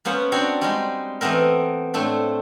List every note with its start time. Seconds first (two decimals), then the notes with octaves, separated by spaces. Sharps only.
0.05 A#3 B3 C#4 C5 F#5
0.32 C4 D4 F#4 C#5 D5
0.61 G3 G#3 D#4
1.21 E3 A3 B3 C4 A#4
1.94 A2 A3 C4 D4